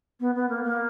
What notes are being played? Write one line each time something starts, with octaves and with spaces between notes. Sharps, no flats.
B3
B3
A#3
A#3